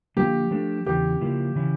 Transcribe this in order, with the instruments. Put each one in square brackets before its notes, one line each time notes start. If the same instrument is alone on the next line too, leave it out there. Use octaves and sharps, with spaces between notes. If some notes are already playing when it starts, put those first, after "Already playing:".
[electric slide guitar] D3 F3 A#3 [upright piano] G4
[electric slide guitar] F3 A3 D4 A4
[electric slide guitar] E2 C#3 E3 [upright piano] G4
[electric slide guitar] C#3 F3 A#3 E4
C#3 E3 C#4 E4